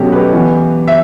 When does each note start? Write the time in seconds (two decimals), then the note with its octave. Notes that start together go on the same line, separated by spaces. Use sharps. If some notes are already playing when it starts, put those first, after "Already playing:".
Already playing: B2 F#3 A3 C#4 F#4 G4 A4
0.12 G4 B4
0.32 E3 B3
0.88 E5